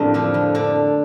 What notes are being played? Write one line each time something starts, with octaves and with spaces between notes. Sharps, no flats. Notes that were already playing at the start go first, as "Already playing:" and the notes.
Already playing: F2 A2 A#3 C4 D4 G4
D3 F3
F2
D3